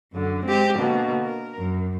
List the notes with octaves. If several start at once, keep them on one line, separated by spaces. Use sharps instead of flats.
F#2 D3
G#3 C4 G4
B2 D3 A#3
A#4
F#2